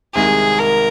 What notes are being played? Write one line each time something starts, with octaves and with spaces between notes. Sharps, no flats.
C2 C3 D#3 G#3 G#4
A#4